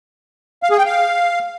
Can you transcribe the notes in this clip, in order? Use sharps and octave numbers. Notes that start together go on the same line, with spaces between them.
F5
G#4
G5
F5